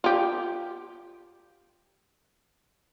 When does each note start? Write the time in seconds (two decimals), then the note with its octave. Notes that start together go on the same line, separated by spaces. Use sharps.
0.04 F4 G4